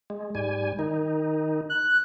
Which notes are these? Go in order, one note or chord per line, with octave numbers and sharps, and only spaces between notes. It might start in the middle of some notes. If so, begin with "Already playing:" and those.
G#3
G#2 G3 G#5
D#3 D#4
F#6